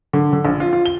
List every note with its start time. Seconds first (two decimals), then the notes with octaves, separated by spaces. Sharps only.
0.13 D3
0.33 D3
0.45 A#1
0.60 F4
0.73 F4
0.86 G7